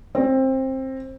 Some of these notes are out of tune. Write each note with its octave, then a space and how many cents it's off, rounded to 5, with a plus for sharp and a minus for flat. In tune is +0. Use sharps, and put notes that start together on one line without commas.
C4 +20